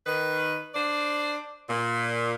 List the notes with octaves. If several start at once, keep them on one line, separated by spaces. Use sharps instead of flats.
D#3 B4
D4 C5 D5
A#2